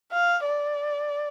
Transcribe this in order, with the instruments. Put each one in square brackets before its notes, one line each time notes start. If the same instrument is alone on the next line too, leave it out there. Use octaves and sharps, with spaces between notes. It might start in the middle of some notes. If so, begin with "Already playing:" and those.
[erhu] F5
D5